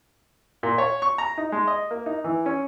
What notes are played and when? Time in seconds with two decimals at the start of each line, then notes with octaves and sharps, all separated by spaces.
0.63 A#2
0.78 C#5
1.02 C#6
1.18 A#5
1.38 D#4
1.52 G#3
1.67 D#5
1.91 A#3
2.06 D#4
2.24 E3
2.46 C#4